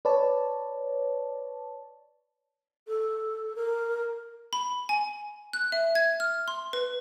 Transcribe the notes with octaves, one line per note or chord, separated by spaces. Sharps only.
B4 C#5 D5 A5
A4
A#4
B5
G#5
F#6
E5
G#6
F6
C6
B4